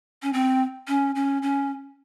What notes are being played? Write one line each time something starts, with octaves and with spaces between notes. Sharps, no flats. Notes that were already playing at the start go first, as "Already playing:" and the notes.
C#4
C4
C#4
C#4
C#4